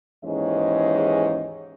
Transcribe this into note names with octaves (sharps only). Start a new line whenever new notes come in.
D#2 G#2 E3 G#3 C#4 D#5